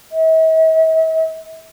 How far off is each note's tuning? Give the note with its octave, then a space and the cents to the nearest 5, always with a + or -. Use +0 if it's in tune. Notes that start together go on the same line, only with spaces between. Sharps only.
E5 -45